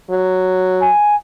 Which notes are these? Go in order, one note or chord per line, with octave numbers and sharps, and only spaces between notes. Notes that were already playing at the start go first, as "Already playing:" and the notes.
F#3
G#5